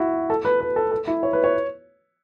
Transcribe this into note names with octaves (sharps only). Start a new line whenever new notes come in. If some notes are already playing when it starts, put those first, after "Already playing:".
Already playing: E4 F#4
A4
B4
B4
A4
A4
E4
C#5
B4
C#5